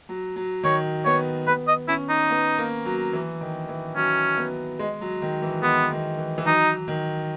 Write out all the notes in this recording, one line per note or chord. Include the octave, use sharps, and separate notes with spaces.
F#3
F#3
D#3 C#5
B3 C#5
B3 B4
D#5
C#4 E4
D#4
B3
A#3
F#3
E3
D#3
E3
F#3 C#4
B3
G#3
F#3
D#3
E3
G#3 B3
D#3
E3
E3
F#3 D#4
D#3